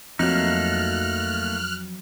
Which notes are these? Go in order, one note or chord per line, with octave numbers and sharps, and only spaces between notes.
F2 F#3 A3 A#3 D#4 F6 F#6